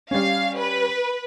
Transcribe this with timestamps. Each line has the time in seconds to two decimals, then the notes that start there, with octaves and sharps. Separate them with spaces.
0.11 G3 C#4 F5
0.57 B4